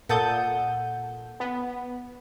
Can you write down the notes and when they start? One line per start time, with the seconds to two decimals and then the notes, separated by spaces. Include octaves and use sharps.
0.09 A#2 A4 F#5 A5 D#6 G6
1.40 B3